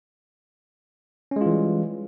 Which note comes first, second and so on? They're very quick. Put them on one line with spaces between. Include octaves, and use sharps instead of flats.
C#4 G#3 F4 E3 G3